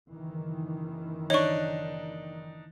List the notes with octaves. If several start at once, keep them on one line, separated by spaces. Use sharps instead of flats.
F#1 D#3 E3
D4 D#4 C#5 C#6